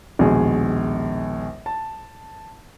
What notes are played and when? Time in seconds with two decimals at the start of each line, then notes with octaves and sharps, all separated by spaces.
0.19 A#1 D#2 B2 G#3 G#4
1.66 A5